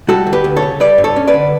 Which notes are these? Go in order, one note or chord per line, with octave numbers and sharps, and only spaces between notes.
G3 F#4 A4
D2
G4 B4
D2
A4 C#5
C#3
G3 B4 D5
G2
A4 C#5
C#4
B4 D5
D3